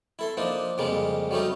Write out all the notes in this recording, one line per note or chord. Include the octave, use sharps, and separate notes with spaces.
E4 A4 C6
F3 A#3 D4 D#4
F2 C#3 G3 G#3 A#3
F#3 G3 A3 C#4 D#4